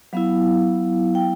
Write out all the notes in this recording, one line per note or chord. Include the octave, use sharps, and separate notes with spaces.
F#3 B3 E4 F5
G5